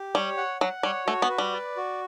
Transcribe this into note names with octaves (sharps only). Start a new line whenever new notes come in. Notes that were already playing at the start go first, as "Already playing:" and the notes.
Already playing: G4
G3 C#5
F#5
F#3 F#5
G3 C#5
A3 F#4
B3
B4
G3
D5
F#4